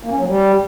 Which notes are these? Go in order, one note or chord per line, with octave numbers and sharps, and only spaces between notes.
A#3
C#4
F#3
G3